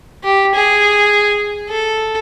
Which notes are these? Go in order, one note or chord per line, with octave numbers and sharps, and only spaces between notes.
G4
G#4
A4